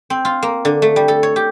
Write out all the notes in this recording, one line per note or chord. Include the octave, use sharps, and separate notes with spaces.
C4
F4
A#3
D3
A3
G3
A4
C#5
G4